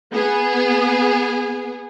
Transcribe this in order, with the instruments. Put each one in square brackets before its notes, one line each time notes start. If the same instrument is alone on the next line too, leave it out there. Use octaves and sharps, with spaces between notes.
[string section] B3 G#4